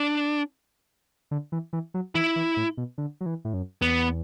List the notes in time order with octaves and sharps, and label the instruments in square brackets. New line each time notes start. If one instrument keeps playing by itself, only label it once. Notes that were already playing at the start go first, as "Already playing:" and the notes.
Already playing: [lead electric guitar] D4
[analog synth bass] D3
E3
E3
F#3
[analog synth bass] E3 [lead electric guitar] E4
[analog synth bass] E3
A2
B2
D3
F#3
E3
A2
F#2
[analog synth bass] E2 [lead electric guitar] B3